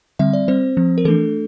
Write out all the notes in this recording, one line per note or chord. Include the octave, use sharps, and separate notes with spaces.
D3 G3 C4 E5
D5
G3 C4 C5
F3 C4
A#4
E3 A3 D4 A4